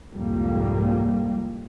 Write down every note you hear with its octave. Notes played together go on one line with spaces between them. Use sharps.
C2 F2 G#2 F3 G3 A#3